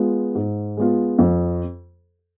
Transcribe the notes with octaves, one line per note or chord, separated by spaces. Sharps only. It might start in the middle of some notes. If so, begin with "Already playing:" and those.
Already playing: G#3 B3 F4
G#2
G#3 B3 F4
F2